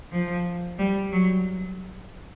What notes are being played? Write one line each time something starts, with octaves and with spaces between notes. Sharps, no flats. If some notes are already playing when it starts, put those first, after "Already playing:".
F3
G3
F#3